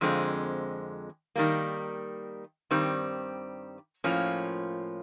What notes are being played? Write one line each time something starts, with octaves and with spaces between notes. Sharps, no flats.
F2 D3 F3 G#3 C4
D#3 G3 A#3
G2 D#3 G3 C4
A2 F3 A#3 C#4 F4